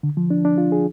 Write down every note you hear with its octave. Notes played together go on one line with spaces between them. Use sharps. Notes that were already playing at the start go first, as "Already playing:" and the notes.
D3
F3
D4
D4
F4
G#4